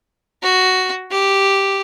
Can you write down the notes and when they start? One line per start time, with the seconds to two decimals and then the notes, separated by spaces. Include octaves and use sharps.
0.43 F#4
1.12 G4